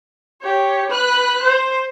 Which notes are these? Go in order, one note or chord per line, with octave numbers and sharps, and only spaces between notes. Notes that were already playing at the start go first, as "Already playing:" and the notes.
G4 C#5
B4 F#6
C5